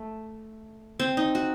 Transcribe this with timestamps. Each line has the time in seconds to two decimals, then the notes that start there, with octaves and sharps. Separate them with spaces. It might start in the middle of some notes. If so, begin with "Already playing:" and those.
Already playing: A3
1.00 C4
1.17 D#4
1.35 F#4